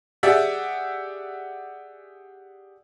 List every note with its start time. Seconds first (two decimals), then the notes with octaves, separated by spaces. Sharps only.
0.23 G4 G#4 D5 E5 F#5